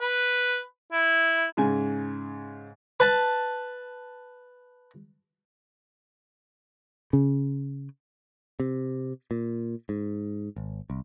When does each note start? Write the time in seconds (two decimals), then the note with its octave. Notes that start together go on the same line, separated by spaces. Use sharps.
0.01 B4
0.92 E4
1.57 G#2 C#3 G#5
3.00 B4 A5
7.13 C#3
8.60 C3
9.31 A#2
9.89 G#2
10.56 G#1
10.90 C2